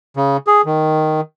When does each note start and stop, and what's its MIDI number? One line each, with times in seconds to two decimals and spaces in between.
0.17 0.37 49
0.47 0.61 68
0.65 1.21 51